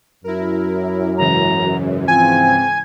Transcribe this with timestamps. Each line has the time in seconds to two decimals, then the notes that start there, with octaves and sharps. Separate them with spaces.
0.24 F#2 E4 A#4
1.18 G#2 C#3 E3 A#5
2.08 F3 C4 G#5 G#6